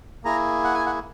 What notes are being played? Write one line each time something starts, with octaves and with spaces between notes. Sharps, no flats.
A#3 E4 G#4 A#5
F#5
G#5
F#5